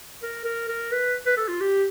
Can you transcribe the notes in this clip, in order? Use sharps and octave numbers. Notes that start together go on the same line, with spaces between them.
A#4
A#4
A#4
B4
B4
A4
F4
G4